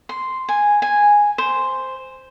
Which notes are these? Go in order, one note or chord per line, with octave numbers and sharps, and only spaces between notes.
C6
G#5
G#5
C5